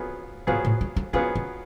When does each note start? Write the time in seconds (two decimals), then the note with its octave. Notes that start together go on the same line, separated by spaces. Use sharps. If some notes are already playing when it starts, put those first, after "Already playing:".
Already playing: F#3 B3 F4 G#4
0.47 G#2 F#3 B3 F4 G#4
0.65 A2
0.81 G#3
0.96 A3
1.13 F#3 B3 C#4 F4 G#4
1.35 C#4